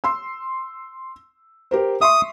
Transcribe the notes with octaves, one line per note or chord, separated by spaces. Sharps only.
C6 E6
G4 A#4 C5
E5 C6 C#6 D#6